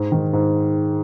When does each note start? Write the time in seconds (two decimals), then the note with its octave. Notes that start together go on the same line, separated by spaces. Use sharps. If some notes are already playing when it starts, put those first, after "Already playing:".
Already playing: G#2
0.12 D#3
0.33 G#2